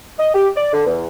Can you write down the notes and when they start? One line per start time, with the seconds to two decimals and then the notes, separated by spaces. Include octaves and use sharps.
0.19 D#5
0.34 G4
0.56 D5
0.73 D3
0.86 E2